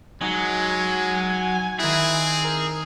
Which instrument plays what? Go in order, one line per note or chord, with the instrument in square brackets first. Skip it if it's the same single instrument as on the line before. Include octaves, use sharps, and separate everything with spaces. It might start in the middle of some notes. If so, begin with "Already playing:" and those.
[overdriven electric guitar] F#3 [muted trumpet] G#3 [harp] D#4 [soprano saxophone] G#5
[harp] D#3 F#6 [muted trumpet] C4 [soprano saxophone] E4 [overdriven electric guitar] G#4
[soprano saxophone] A#4